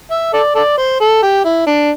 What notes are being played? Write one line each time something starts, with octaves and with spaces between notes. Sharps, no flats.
E5
A4 D5
A4 D5
C5
A4
G4
E4
D4